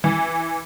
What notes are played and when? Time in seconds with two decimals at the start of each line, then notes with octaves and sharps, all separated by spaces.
0.04 E3